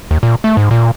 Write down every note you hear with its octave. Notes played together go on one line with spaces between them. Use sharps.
D#2
A#2
A3
G#2
A#2